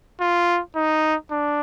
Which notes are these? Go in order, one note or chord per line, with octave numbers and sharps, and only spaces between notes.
F4
D#4
D4